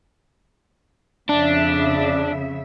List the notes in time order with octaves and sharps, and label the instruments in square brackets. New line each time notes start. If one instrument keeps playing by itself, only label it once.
[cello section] F2 C#3 E5 [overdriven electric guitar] D4